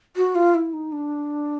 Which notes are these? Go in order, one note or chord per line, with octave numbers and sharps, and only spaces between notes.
F#4
F4
E4
D#4
D4